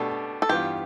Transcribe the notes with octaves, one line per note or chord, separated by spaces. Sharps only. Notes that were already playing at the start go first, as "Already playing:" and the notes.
Already playing: B2 A3 D4 G4 A4
A4
G2 E3 B3 F4 G4